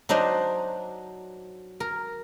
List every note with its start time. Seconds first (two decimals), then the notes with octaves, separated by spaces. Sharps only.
0.09 F#3 D4 D#4 C5 D#5
1.80 A#4